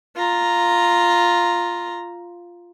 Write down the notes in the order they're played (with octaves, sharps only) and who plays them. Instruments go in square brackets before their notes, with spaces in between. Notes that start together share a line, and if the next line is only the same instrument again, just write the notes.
[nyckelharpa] F4 A#5